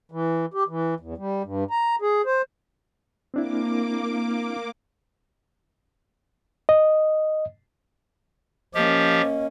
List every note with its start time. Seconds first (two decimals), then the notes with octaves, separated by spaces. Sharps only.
0.12 E3
0.54 G4
0.68 E3
1.00 E2
1.17 G3
1.44 G2
1.71 A#5
2.02 G#4
2.26 C5
3.34 A#3 C4 D4 E4 D6
6.69 D#5
8.75 F3 A#3 C#4 G4 D#5